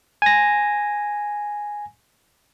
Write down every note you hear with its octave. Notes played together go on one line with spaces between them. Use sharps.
G#5 A#6